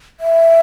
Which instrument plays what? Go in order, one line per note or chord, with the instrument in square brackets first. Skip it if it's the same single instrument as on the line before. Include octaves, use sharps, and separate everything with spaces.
[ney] E5